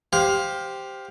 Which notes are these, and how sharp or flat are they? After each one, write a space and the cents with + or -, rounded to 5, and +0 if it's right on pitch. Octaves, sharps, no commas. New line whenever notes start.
G4 +0 C5 -5 F5 +15